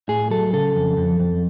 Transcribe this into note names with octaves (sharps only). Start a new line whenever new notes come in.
A2 G#4
F#3 A4
C#3 A4
F2
F2
F2